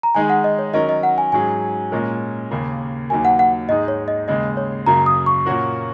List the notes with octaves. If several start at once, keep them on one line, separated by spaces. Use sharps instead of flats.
A#5
D#3 G#3 D#4 G#4 G#5
F#5
D#5
C#5
D#3 F#3 C#4 A#4 D#5
D#5
F#5
G#5
G#2 F#3 C#4 G#4 G#5
A#2 G#3 C#4 A#4
D#2 C#3 A#3
D#2 D#3 F#3 A#3 G#5
F#5
F#5
G#2 G#3 D#4 G#4 D#5
C#5
D#5
D#2 C#3 G#3 D#5
C#5
F#2 C#3 F#3 A#3 A#5
D#6
C#6
A#2 A#3 C#4 F#4 A#4